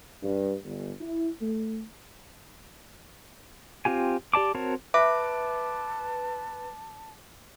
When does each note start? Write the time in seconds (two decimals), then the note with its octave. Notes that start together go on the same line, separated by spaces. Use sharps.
0.23 G2
0.63 G1
1.01 E4
1.40 A3
3.85 C4 F4 G4 G#5
4.34 G4 D5 A5 D6
4.55 C4 F#4 A#4 C#5 A5
4.94 B4 E5 A5 D6